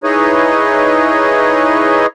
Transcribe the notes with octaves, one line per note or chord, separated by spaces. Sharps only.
D#4 E4 G#4 B4 C#5 D#5